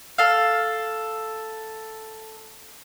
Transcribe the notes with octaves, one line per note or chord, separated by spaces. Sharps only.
A4 F5